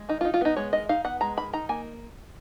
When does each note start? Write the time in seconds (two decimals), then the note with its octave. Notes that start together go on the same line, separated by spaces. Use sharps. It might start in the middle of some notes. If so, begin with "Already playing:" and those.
Already playing: G#3
0.09 D#3 D#4
0.21 F4
0.25 D#4
0.34 F4
0.41 B3 D#4
0.57 G#3 C#5
0.73 D#3 D#5
0.89 D#4 F5
1.05 B3 F#5
1.21 G#3 A#5
1.37 D#3 B5
1.53 D#4 A#5
1.69 A#3 G#5